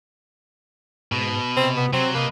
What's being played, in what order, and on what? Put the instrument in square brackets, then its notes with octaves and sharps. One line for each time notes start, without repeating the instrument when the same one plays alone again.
[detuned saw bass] G#2 [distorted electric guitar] B2
[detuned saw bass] C3 [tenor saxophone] C4
[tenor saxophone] B3
[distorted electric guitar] F#3 [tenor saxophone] C4
[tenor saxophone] A#3 [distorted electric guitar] B4 D#5